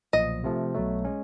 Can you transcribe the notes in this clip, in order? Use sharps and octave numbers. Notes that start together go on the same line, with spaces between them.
B1 A#2 F3 D#5
C3 F3 A3
B1 B2 F#3 A3
G#3 C#4